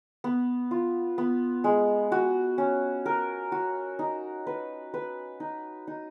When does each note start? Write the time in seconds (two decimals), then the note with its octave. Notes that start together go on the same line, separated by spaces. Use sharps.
0.24 B3
0.71 F4
1.18 B3
1.64 G#3
2.12 F#4
2.58 C#4
3.06 A#4
3.52 F#4
3.99 D#4
4.47 B4
4.94 B4
5.40 D#4
5.87 D#4